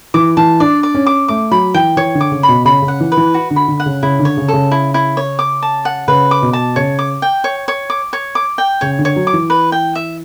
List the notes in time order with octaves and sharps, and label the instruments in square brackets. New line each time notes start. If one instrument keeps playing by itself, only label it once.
[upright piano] E3 [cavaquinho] D6
[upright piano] E3 [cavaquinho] A5
[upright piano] D4 [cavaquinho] D5
[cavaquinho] D5
[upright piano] C#4
[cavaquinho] D6
[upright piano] A3 [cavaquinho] D6
[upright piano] F#3 [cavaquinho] B5
[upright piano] E3 [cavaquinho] G5
[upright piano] E3 [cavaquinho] C#5
[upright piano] D3
[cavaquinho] D6
[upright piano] C#3
[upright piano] B2 [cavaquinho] B5
[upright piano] C#3 [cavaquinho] B5
[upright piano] C#3
[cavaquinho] F#5
[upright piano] E3
[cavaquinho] B4
[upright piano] E3
[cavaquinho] F#4
[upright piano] D3
[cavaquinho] B5
[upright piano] D3
[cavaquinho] F#5
[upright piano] C#3
[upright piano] C#3 [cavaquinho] E4
[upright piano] D3
[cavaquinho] C#5
[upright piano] C#3
[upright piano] C#3 [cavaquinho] A4
[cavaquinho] E4
E4
C#5
D6
A5
F#5
[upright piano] C#3 [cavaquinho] B4
[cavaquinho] D6
[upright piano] B2
[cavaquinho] A5
[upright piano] C#3 [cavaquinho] C#5
[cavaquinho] D6
G5
C#5
C#5
D6
C#5
D6
G5
[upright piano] C#3 [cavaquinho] C#5
[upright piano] D3
[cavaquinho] C#5
[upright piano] F#3
[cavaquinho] D6
[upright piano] E3
[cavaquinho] B4
G5
E5